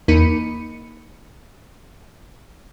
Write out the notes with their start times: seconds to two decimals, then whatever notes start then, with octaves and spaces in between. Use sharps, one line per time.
0.08 E2 A#3 D#4 B5 C#7 D#7